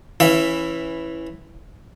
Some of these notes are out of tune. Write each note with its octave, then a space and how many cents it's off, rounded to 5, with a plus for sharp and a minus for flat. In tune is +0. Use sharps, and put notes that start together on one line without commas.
E3 +0 C#4 -20 E5 +0